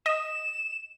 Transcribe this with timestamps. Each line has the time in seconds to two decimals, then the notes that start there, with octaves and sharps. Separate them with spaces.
0.06 D#5 E7